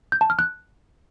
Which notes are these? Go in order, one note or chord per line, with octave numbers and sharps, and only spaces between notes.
G6
A5
F6
F#6